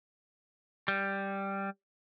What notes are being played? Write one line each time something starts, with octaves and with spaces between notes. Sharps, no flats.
G3